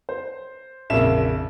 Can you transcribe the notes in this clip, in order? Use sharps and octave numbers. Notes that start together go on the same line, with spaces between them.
C5
A#1 F2 C#3 A#3 E5 E7